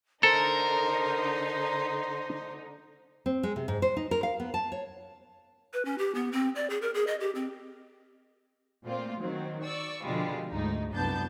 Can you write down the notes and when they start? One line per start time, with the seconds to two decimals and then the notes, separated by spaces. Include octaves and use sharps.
0.23 D3 D#4 A4 A#4 C5
3.26 C4
3.43 G#3
3.56 C3
3.68 G#2
3.82 C5
3.97 D#4
4.11 A#4
4.23 F5
4.40 B3
4.54 A5
4.72 C#5
5.73 B4
5.85 C#4
5.98 G4
6.15 B3
6.32 C4
6.56 D5
6.70 G#4
6.82 A#4
6.94 G#4
7.07 D#5
7.20 G4
7.35 C4
8.83 A#2 A3 A#3 C4 F4
9.19 D#3 F#3 C4
9.63 D5 C#6 E6
10.04 B2 D3 F3 G3 G#3 F4
10.50 D2 G#2 D#4
10.94 C2 F#2 B3 D4 A5 G6